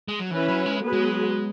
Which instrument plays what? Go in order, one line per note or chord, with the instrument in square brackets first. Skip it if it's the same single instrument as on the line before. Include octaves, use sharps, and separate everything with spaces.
[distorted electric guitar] G#3
F#3
[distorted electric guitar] E3 [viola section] C#4 E4 B4
[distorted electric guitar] F#3
G#3
[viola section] F#3 B3 G#4 B4
[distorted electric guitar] G#3